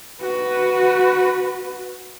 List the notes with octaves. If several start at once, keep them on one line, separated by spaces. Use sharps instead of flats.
F#4 B4